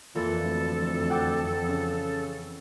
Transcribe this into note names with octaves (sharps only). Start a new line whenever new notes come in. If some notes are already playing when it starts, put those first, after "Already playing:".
F2 A#2 E3 A4
D2
F#5 G5 D6
C#3